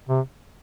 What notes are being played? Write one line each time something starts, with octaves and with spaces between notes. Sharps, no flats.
C3